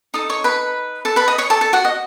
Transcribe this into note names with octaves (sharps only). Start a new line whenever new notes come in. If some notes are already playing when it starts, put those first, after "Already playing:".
D#4 A4 D#6
C#5 C#6
B4 B5
A4 A5
B4 B5
D#5 D#6
C#5 C#6
A4 A5
A4 A5
F#4 F#5
D#5